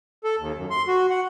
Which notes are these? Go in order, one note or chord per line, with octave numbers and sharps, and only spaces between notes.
A4
D#2
F#2
C6
F#4
F#5